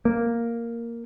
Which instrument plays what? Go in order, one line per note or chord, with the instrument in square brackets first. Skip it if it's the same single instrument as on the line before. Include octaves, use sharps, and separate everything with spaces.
[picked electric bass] A#3